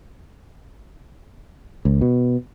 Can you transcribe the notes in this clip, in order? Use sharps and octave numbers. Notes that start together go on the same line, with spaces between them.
C#2
B2